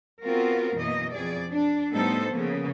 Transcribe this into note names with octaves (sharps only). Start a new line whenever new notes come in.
B3 C4 F4 F#4 A#4
F#2 B2 E3 A#3 D#5
F2 G#4 D5
D4
A2 G3 B3 D#4 A4 C5
C#3 F3 A#3 B3